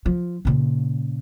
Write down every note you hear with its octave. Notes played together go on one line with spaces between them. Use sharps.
F3
A#2 C#3